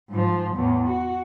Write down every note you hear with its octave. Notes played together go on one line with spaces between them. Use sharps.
G#2 F3
E2 A2
F#4